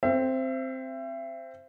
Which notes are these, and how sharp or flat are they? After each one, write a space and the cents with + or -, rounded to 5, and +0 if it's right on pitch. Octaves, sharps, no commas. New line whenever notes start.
C4 +0 E5 +35